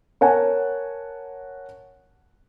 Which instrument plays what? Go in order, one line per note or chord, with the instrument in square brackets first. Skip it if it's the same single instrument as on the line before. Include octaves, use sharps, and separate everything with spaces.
[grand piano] A#4 C#5 F#5 G#5 A5